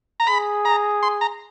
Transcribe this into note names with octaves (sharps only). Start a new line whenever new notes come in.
A#5
G#4 B5
A#5
C6
A#5